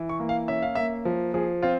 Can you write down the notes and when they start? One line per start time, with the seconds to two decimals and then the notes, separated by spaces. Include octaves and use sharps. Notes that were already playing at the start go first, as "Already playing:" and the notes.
Already playing: E3
0.09 C#6
0.20 A#3
0.29 F5
0.48 C#4 E5
0.62 F5
0.75 A#3 E5
1.05 F3
1.34 F3 G#4
1.62 C4 F4